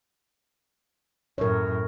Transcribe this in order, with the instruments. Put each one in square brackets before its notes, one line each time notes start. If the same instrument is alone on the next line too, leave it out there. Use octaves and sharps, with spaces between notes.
[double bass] F#2 A2 [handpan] A#4 C#5